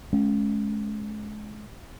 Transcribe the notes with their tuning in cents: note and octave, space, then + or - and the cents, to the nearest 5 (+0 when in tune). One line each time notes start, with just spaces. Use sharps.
G#3 +30 C#4 +0